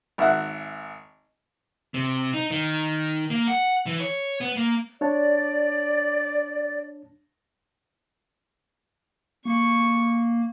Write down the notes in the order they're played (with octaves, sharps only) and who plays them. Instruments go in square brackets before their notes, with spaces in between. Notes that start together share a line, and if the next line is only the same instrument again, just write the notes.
[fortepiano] G#1 E5 F#5
[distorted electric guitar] C3
D#4
D#3
A#3
F#5
E3
C#5
B3
A#3
[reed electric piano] D4 C#5 A5 [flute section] D5
[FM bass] A#3 [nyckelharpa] C#6